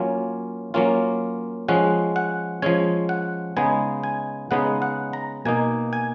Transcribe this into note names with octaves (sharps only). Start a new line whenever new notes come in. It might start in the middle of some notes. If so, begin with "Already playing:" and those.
Already playing: F#3 A#3 C#4 F4 G#5
F#3 A#3 C#4 F4
F3 G#3 C#4 F#5
F#5
F3 G#3 C#4 G#5
F#5
C#3 G#3 B3 D#4 G#5
G#5
C#3 G#3 B3 D#4 F#5
F#5
A#5
B2 A#3 D#4 G#5
G#5